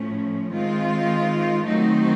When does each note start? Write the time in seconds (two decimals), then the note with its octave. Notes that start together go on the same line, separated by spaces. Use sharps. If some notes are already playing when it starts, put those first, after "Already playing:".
Already playing: A2 F3 A3 C#4
0.52 D#3 G#3 C4 F4
1.65 D#3 F#3 A3 C4 D#4